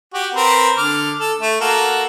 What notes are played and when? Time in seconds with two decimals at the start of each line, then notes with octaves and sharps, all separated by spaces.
0.14 F#4 G4
0.34 C4 A#4 B4
0.78 D3 D6 F6
1.19 A4
1.40 A3
1.61 A#3 F#4 A4